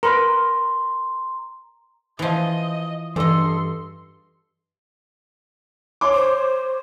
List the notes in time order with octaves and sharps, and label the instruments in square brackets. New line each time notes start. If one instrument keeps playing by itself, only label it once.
[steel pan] A#4 B4 [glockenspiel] A#5 C6
[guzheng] E3 F3 [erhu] D#5
[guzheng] G2 D#5 [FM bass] E3 [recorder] A4 [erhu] C6
[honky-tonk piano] C#5 C6 D6
[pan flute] C5